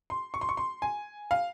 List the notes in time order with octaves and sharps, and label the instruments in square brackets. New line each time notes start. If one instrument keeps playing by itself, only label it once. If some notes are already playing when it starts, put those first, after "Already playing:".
[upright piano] C6
C#6
C6
C#6
C6
G#5
F5